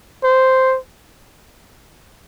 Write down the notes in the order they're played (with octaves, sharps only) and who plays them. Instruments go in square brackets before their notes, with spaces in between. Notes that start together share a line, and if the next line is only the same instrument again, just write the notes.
[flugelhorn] C5